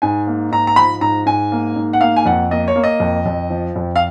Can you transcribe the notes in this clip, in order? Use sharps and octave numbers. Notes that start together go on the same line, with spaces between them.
G#2 G#5
A#3
G#2 A#5
A#5
F3 B5
G#2 A#5
G#2 G#5
A#3
G#2
F#5
A#3 F5
G#5
F2 F#5
A#3 D#5
C#5
A#3
D#5
F2
F2
F3
F2
F5